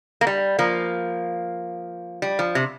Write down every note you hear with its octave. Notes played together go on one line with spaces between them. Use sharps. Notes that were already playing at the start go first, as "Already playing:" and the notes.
A#3
G3
F3 A#3
G3
F3
C3